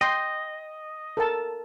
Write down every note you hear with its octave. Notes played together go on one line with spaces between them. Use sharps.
D#5 G5 C6
A4 A#4 A5